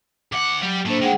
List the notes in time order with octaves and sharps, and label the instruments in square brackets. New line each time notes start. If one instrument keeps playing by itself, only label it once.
[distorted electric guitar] D2 F#5 [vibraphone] D6
[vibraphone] F#3 [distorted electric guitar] G3 G4
[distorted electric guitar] A2 A3 [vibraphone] A#3 D4 C5
[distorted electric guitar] D#3 G#3 [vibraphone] G#4 F#5 G5